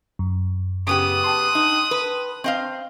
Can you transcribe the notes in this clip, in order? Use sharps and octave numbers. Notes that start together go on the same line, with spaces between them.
F#2
C#3 B3 G4 D#6 F#6
G5 A5 C6
D#4
B4
C4 D#5 F5